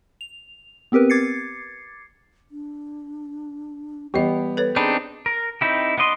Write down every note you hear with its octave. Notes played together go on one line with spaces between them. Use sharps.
F7
B3 C4 G4 A#4 B4
D6 G#6 A6 C7 C#7
D4
E3 G3 B3 G4 D#5
A4 B4 C#5
C4 D4 D#4 G#4 B5
A#4
C4 D#4 E4 G4
B3 D#4 D5 D#5 C6